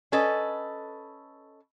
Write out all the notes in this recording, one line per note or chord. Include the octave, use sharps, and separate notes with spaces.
C#4 A4 B4 D#5